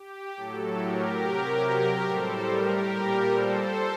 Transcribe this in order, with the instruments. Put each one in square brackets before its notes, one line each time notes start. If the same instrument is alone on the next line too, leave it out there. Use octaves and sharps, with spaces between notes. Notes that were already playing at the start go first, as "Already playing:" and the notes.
Already playing: [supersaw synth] G4
A2 F#3 A4
G4 A#4
C3 F#3
A2 G3 A4 C5
G4 A#4
A#2 G3
A4 C5